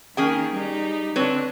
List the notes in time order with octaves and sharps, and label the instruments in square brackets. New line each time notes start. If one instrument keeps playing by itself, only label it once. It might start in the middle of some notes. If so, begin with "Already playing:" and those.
[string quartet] D#3 A#3 [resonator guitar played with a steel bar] C#4 G#4 G5
[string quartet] G3 D#4
[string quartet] D3 D4 [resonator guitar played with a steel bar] C4 B4 C#5